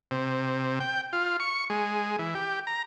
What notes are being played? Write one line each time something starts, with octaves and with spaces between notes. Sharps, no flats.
C3
G5
F4
C#6
G#3
E3
G4
A#5